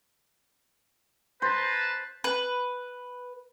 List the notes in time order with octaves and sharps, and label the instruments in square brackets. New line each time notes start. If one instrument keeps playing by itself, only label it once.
[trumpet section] B4 A5 A#5 [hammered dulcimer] C5
[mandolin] B4